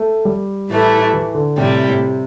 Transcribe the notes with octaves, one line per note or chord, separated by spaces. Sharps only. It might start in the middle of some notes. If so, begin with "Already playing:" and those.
Already playing: A3
G3
A2 E3 A3 E4
E3
D3
A2 C3 G3 E4